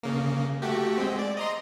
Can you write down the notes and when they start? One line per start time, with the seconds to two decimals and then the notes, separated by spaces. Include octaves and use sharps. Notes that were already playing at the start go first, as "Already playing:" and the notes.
0.03 C#3 A#3
0.62 A3 F#4 G4
0.98 G#3 C4
1.19 D5
1.37 D#5 A#5 C6